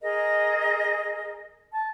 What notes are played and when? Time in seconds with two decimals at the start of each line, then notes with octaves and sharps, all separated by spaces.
0.02 G#4 A#4 D#5
1.73 A5